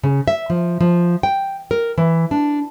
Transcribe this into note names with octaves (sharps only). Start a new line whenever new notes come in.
C#3
E5
F3
F3
G5
A#4
E3
D4